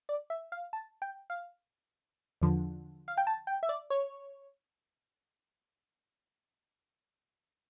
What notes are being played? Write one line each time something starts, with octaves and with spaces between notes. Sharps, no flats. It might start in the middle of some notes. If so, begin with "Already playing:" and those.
D5
E5
F5
A5
G5
F5
E2 D3 F3
F5
G5
A5
G5
E5
D5
C#5